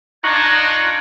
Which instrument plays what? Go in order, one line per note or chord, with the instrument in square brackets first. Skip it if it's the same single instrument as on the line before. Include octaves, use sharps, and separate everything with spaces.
[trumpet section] D4 D#4 F4 [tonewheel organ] A#5 C#6 F#6 [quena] G#6